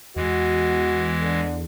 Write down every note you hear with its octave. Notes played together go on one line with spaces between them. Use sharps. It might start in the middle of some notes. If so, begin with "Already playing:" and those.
E2 E3 G#3 F#4
D3